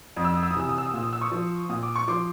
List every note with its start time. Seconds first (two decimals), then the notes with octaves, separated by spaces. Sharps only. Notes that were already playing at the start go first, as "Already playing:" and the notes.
0.16 F2 D#6
0.24 E6
0.34 D#6
0.43 E6
0.51 D#6
0.55 C3 E3 E6
0.69 D#6
0.78 E6
0.86 D#6
0.93 A#2 E6
1.03 D#6
1.13 E6
1.21 C#6 D#6
1.31 F3
1.69 A#2 D#6
1.83 D6
1.96 C#6
2.08 F3 C6 D6